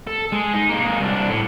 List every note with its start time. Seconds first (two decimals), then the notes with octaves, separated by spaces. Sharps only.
0.07 A4
0.32 G#3
0.53 D#4
0.69 G#3 A#3
1.00 C2 D4
1.29 A2